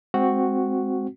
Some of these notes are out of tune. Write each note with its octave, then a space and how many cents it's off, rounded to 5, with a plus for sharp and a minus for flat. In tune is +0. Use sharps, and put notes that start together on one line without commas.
G#3 +0 C4 +0 F#4 +0